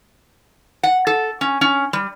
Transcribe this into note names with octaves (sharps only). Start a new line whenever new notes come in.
F#5
A4
C#4
C#4
G3